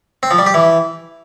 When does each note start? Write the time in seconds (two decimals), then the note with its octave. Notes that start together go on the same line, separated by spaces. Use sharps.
0.23 C4
0.31 F3
0.39 G3
0.46 G4
0.54 E3